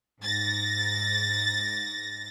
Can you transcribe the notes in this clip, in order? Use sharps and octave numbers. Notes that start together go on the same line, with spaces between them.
G#2 A6 A#6